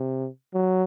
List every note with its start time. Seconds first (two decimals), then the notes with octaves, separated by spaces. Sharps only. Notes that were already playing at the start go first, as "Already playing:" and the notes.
Already playing: C3
0.54 F#3